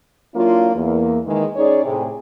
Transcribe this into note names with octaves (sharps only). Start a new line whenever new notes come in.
F#3 A#3 D4 E4 F4
E2 A#3
D#3 E3 G#3
C#4 D#4 G#4 C#5 D5
A2 C3 G#4